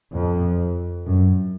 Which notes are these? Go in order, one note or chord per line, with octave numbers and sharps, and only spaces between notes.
F2
F#2